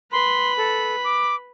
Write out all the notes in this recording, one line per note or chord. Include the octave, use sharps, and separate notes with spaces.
B4 B5 C6
A4
D6